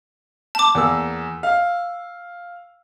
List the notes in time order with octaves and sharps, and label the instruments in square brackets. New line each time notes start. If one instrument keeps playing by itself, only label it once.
[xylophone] A5 D6
[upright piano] E2 A#3 E6
F5